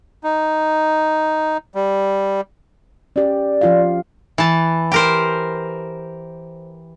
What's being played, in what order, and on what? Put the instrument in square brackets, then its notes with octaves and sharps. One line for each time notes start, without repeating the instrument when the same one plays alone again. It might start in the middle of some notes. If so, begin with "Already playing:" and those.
[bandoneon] D#4
G3
[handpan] C#4 G4 [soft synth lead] D5
[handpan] F3 F4 F5
[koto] E3 A5
G4 A#4 C5